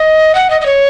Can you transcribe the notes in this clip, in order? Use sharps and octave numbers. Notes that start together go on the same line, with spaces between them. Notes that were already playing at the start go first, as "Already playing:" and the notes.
Already playing: D#5
F#5
D#5
D#5
C#5